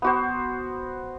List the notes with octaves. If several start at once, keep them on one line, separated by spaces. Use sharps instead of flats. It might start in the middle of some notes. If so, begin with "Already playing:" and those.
B3 F#4 C5